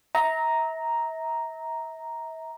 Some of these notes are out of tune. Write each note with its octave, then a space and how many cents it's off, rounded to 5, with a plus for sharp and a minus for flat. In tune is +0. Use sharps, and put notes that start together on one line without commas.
E5 -35 A#5 +0